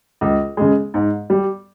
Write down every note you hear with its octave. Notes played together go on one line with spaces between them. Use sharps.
C#2
C#3 G#3
G#2
G3